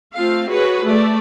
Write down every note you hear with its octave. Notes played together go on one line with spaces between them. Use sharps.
A3 C4 F4 F5
F#4 G#4 B4 C#5
A3 D5